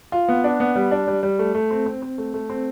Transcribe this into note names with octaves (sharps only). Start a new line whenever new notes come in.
F4
B3
D4
B3
G3
D4
G3
G3
A3
A3
C4
C4
C4
A3
A3
C4